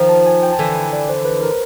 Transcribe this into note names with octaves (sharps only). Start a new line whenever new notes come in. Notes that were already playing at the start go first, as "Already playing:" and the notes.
Already playing: D#3 F3
A5
G#5
G5
A5
D3 E3 G#5
G#5
D5
C5
B4
A#4